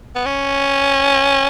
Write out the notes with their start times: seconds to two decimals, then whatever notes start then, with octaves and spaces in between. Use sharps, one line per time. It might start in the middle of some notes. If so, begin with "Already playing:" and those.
0.15 B3
0.26 C#4